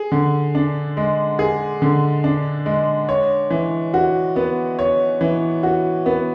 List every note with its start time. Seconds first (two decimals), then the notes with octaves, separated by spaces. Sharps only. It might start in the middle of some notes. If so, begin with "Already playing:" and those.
Already playing: G#4
0.12 D3
0.55 D4
0.97 G#3
1.39 G#4
1.82 D3
2.24 D4
2.66 G#3
3.09 C#5
3.50 E3
3.94 F#4
4.36 B3
4.79 C#5
5.21 E3
5.63 F#4
6.06 B3